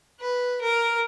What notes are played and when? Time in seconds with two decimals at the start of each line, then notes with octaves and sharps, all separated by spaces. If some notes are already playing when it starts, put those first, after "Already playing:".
0.21 B4
0.61 A#4